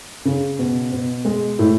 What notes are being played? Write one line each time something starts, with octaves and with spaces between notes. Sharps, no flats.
C#3
B2
B2
G#3
A2